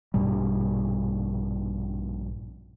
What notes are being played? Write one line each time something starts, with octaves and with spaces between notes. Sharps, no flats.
A#1 G2 B2 G3